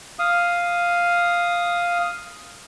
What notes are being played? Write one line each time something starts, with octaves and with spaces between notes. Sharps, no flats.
F5 D#6